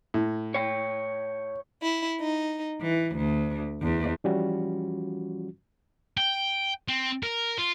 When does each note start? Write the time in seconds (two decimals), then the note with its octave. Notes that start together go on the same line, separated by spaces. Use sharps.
0.14 A2
0.54 C#5 G5
1.82 E4
2.20 D#4
2.80 E3
3.16 D2
3.80 E2
4.24 E3 F3 G3 C#4 F4 F#4
6.17 G5
6.88 C4
7.23 A#4
7.58 F4